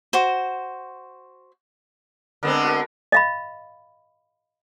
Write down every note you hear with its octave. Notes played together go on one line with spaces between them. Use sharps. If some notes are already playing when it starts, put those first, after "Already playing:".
F#4 C5
D3 G#3 B3 C4 A#4
F#4 A4 A#4
D#5 F5 B5